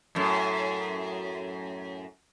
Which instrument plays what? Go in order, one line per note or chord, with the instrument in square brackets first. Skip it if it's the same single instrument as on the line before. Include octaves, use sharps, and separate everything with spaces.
[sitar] F#2 A2